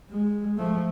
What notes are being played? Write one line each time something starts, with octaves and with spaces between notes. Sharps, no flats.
G#3
F3 A3